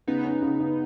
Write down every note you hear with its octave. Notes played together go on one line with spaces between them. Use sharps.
C#3 B3 D#4
C#4
C#3
C#3